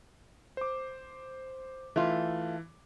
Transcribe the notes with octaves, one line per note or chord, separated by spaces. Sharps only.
C5 D6
E3 A3 F4